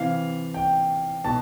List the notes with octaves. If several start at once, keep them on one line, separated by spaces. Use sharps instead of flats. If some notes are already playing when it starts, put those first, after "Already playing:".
Already playing: C3 E3 F5
G5
B2 A5